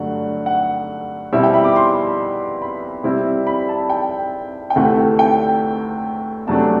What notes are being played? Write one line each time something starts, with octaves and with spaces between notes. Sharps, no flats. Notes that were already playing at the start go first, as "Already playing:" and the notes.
Already playing: G2 D3 F#3 A3 F#5
F#5
B2 G3 C4 E4 E5
G5
B5
D6
C6
B5
C3 G3 C4 E4
B5
A5
G5
G5
D2 C3 E3 A3 F#5
G5
E2 C3 F#3 A3 D4 A5